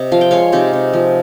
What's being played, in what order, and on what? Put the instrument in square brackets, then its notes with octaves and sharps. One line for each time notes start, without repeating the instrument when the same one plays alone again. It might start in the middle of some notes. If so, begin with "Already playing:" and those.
Already playing: [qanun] C3 D#5
F3 F5
G5
G#3 C#5 F5
C3 D#4 G4
C3
F3